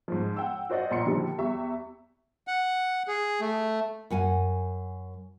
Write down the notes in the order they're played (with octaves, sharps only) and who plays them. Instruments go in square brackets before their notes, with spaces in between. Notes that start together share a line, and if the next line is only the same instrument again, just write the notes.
[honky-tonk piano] G#2 F3
F#5 G5 E6
F#4 C5 D5 D#5 F#5
A#1 A#5 C6 C#7
A#2 D3 D#3 F3 G3
E2 G3 E5 C#6
[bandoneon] F#5
G#4
A3
[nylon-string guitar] F#2 F#5 G#5